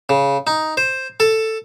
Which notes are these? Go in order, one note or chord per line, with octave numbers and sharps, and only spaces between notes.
C#3
D#4
C5
A4